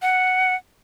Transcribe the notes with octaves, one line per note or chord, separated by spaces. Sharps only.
F#5